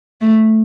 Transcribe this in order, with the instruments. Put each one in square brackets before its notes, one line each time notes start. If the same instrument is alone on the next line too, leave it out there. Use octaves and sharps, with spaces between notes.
[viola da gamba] A3